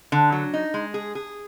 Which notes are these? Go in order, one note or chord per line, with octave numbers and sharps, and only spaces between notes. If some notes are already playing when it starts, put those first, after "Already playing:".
D3
F#3
D#4
G#3
G#4
G#4